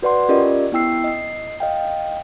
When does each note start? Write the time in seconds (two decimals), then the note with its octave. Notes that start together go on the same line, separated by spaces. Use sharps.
0.02 F#4 B4 D5 F#5 C6
0.29 C#4 F4 G4 A#4 D5 D#5
0.72 B3 E4 G5 E6 C7
1.04 D#5 C7
1.60 D#5 F5 G5